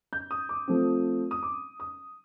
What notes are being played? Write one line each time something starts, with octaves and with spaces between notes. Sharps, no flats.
G6
D#6
D6
F3 A3 C4
D#6
D6
D#6